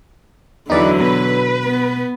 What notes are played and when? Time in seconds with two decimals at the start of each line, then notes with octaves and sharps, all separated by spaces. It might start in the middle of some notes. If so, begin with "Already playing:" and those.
0.70 E2 D3 E3 F#3 D#4 B4 D5
1.00 B2 B4
1.65 B3